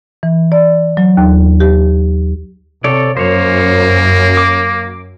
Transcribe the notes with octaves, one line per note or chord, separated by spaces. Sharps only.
E3
D5
F#3
D#2
G4
C3 A4 C#5 D5
F#2 A#3 C5 C#5
D6